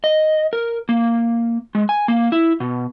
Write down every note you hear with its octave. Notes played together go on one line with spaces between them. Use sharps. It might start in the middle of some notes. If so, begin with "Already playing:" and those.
D#5
A#4
A#3
G#3
G#5
A#3
E4
B2